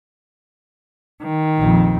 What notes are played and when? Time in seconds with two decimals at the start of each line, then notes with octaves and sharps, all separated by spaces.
1.23 D#3
1.58 A#1 F2